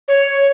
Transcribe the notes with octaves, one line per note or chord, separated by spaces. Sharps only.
C#5